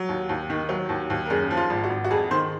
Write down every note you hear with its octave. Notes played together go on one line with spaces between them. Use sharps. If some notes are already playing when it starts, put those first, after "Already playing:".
Already playing: F#3
D#2
D#2
D#3
F#3
D#2
D#2
A#4
F#2 G#4
F3
F4
G#1
F#4
G#1
F#4
F2 G#4
D#3 C5